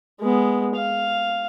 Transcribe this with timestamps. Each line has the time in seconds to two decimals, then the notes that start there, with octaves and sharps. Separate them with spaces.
0.21 G#3 B3
0.76 F5